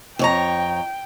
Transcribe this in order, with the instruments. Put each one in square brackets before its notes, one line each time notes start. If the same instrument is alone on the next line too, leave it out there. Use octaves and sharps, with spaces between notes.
[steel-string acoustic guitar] F2 C#5 A#5 [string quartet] G5